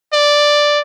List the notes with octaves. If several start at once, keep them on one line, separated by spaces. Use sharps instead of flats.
D5